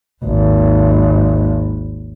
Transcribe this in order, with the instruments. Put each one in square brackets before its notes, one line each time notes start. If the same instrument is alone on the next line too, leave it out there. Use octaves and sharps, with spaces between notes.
[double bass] G#1 D#2